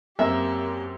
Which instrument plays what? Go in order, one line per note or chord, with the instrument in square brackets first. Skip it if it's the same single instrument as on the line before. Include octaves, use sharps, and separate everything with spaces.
[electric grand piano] F#2 C4 [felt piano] A#3 [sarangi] G4 [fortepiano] E5